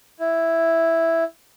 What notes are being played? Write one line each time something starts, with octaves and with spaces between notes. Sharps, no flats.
E4